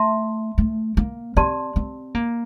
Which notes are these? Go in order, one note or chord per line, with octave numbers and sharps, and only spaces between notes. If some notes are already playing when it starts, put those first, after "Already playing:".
Already playing: A3 E5 A5 C6
A3
A#3
C4 G4 D5 A5 C6
C4
A#3